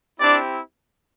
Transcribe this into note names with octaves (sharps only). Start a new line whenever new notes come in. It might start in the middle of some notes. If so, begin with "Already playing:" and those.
C4 D4 E4 G4 D5